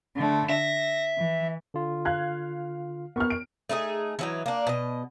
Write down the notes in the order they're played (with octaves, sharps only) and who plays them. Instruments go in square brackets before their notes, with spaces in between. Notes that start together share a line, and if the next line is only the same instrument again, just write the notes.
[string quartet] D3 A3
[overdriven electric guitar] E5 [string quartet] A#6
[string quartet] E3
[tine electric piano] D3 F4
[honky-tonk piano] F5 F#6 G#6
[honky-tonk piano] B3 F6 [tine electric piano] A#4 C#6
[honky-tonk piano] D7
[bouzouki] A3 D#4 F4 G#4
E3 F#3 D#4
A#3 D4
B2 D#5